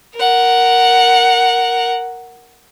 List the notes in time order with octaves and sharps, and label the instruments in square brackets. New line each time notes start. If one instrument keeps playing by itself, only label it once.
[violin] A#4 F#5